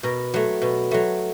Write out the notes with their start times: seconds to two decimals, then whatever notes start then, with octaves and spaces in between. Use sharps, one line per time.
0.03 B2 A#4
0.34 F#3 A3
0.62 B2
0.91 F#3 A3